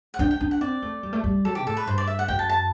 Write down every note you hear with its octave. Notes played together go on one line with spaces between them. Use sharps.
F#5
D4 G5
G5
D4
F#5
C4 D5
A3
G3
A3
G3
F#3 A4
B2 G4
A2 A4
B4
G2 C5
D5
E5
F#5
F#2 G5
A5
A5